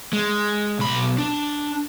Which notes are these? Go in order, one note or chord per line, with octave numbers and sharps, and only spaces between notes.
G#3
B1 B5
D4